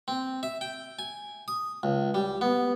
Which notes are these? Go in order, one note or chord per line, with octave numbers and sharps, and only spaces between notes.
C4
E5
G5
G#5
D#6
C#2
G3
B3